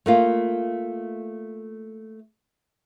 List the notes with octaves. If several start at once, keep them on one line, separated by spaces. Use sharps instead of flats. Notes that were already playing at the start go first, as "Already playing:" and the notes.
A3 A#3 F4